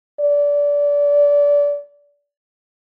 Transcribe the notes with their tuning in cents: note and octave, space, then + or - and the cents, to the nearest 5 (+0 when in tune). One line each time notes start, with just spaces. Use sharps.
D5 -25